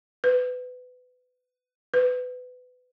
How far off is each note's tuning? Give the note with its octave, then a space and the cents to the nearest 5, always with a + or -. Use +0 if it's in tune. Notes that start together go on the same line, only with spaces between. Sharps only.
B4 +25
B4 +25